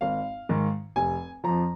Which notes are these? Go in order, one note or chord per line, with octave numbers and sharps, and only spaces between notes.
G#1 F5
G#2 D#3
F1 G#5
F2 F3 A#5